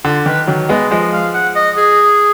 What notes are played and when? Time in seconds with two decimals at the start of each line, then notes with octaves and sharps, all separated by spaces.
0.05 D3 F4
0.26 D#3 B4
0.47 D#3 F#3
0.69 G#3 B3 D#5
0.91 F3 G#3 D#5
1.12 F5
1.34 F#5
1.56 D#5
1.78 G#4